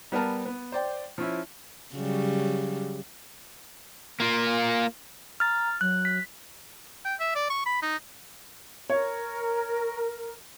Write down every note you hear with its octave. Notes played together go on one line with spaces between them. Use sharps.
G3 B3 A#4 A5
B3
C5 D5 G5
F3 C#4 E4
C#3 F#3 G3
A#3 F4
A#5 F6 A6
F#3 F#6
B6
G5
E5
D5
C#6
B5
D#4
A#4 C#5